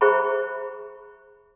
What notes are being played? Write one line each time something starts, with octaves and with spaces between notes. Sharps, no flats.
G#4 C5 E5 A#5 B5 C#6